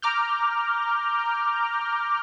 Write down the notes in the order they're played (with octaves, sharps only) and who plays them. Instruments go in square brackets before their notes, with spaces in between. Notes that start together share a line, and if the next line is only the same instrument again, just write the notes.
[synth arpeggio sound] A#5 D6 F6 G6